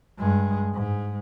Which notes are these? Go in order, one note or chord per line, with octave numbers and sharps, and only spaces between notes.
G2 G#3
G#2